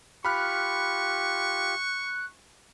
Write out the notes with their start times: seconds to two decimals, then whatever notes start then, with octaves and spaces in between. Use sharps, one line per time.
0.25 F4 G4 B5 C#6 F6 F#6